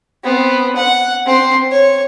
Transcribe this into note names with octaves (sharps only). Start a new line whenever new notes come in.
B3 C4
F#5
C4 C6
C#5